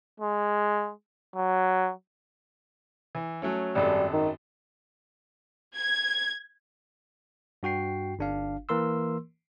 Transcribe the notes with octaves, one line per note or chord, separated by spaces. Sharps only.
G#3
F#3
E3
F#3 A3 C#4
G#1 F#2 G3 A4
D#3
G#6
G2 F#4 G5 C7
G1 D4 F5
E3 A#3 A#4 C6 E6